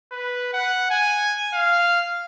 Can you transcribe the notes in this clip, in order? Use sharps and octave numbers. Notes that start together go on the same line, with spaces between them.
B4
F#5
G#5
F5